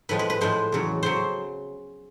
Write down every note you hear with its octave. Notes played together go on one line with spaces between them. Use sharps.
A2 F3 G#3 B4
B4
B4
A2 F3 G#3 C5
E2 C#3 F#3
C#3 F#3 C5